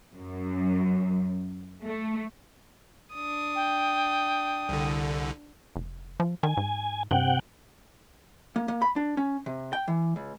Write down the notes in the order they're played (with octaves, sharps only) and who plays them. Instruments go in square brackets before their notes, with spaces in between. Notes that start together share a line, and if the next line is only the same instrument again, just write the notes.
[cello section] F#2
A3
[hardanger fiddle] D4 D#6
[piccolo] G5
[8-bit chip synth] C2 D3
[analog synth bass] F1
F3
[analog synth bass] D#3 [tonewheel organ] G#5
[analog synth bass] G#2
[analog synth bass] G2 [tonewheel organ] C3 F#5 G5
[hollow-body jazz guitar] A#3
A#3
B5
D4
C#4
C3
G5
E3
C#2